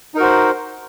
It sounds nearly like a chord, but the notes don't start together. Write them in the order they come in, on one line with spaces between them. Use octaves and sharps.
D#4 A#4 F#4 C5